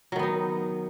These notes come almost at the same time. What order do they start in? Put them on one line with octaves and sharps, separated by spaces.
F#3 D#3 B3 D#4